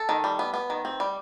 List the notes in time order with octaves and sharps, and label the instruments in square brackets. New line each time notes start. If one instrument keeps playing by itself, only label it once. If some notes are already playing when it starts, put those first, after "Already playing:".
Already playing: [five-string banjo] A4
D#3
G3
B3
B3
D#3
C4
G3